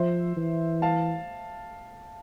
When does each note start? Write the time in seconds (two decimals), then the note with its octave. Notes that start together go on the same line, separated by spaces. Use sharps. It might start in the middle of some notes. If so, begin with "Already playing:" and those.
Already playing: F3 C5 E5
0.36 E3
0.82 F5 A5